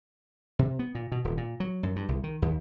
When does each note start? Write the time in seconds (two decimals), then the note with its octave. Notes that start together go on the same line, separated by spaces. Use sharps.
0.59 C3
0.79 B3
0.95 A#2
1.12 B2
1.24 D#1
1.37 A#2
1.60 F#3
1.83 F#2
1.96 G2
2.08 C2
2.24 D#3
2.42 D#2